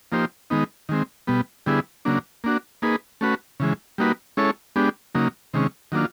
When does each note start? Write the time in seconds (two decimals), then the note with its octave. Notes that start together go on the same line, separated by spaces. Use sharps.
0.12 F3 A#3 D#4 G4 C5
0.50 D#3 G#3 B3 D#4
0.89 D#3 G#3 C4
1.27 B2 G3 B3
1.66 D3 G3 B3 E4 G#4
2.05 C#3 F#3 A#3 D4
2.44 A#3 D4 F#4
2.82 A#3 D#4 G#4 B4
3.21 A3 C#4 F#4 B4
3.60 C#3 E3 G#3
3.98 G3 A#3 D#4 F#4 B4
4.37 G#3 C#4 E4 A4 C#5
4.76 G#3 B3 D4 G4
5.15 C#3 F#3 A#3 D#4
5.54 C3 D#3 G#3 C#4
5.92 D#3 F#3 A#3 D4 F4